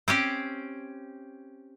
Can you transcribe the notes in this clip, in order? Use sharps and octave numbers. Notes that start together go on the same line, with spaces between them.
C4 C#4 G4